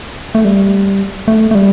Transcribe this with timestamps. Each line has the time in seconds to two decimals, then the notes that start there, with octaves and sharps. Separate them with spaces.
0.35 A3
0.45 G3
1.28 A3
1.51 A3
1.55 G3